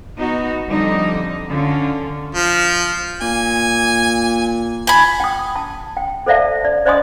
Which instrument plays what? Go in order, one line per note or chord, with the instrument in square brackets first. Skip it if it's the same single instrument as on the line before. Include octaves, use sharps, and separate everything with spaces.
[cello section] B3 D#4 F#4
F2 D3 G3 D#4
D3 C#4 F4
[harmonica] F3
[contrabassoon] A#2 [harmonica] G#5
[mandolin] G#5 B5
[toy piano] G5 D#6
A5
G5
A4 C5 D5 E5 F5 A5
D5
C5 D5 D#5 G#5 C6 D#6